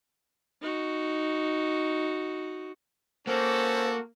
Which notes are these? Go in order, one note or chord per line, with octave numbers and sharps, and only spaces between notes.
D#4 F#4
A#3 C#4 F#4 A4 C5